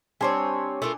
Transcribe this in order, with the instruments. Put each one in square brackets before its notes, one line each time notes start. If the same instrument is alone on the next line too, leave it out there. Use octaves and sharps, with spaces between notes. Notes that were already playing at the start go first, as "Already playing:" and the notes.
[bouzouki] G3 C4 C#5 [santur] D4 G#5
[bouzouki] A3 F4 A#4